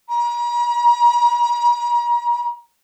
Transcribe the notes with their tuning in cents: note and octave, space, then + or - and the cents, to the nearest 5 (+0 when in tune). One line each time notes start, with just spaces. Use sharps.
A#5 +45